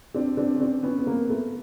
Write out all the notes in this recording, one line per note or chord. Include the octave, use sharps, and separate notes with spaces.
C4 D4
C4 D4
C#4
C4 D4
B3 C#4
B3
A#3 C4
A3 B3